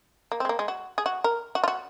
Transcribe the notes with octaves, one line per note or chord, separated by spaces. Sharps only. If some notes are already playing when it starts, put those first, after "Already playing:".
A#3
C4
G#3
A#3
G#3
F#4
G#4
F#4
A#4
F#4
F4
F#4